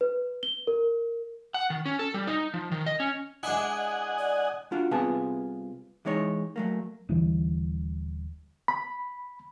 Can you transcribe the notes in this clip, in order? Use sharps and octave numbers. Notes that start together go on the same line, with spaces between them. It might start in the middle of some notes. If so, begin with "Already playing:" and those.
B4
G7
A#4
F#5
D#3
C#4
A4
G3
D#4
F3
D#3
D#5
C#4
G#3 D4 E4 D#5 F#5 G#5
D5
D4 F4 F#4
C2 C3 B3 F4 G#4 A5
E3 G#3 D#4 C#5
F#3 A3 A#3
D#1 D3 E3 G3
B5